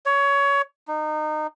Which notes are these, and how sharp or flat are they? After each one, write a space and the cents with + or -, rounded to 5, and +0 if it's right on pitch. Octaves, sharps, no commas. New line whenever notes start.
C#5 +20
D#4 -25